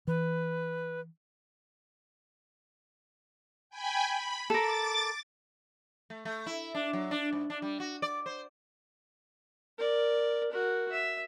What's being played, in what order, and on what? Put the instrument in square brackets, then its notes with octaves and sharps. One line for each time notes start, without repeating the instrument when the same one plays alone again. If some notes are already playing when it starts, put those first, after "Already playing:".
[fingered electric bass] E3 [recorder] B4
[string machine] G5 G#5 B5
B5
[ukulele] A4 A#4 [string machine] D6 A6
[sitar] A3
A3
E4
D4
F#3
D4
G#2
D4
G3
F#4
D5
C5
[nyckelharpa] A#4 D5
F#4 A#4
E5